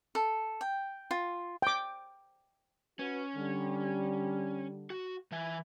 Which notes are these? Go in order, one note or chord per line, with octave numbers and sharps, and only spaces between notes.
A4
G5
F4
G5 D6
C#4 F#4 B4
D3 G3
F#4
E3 E5 G#5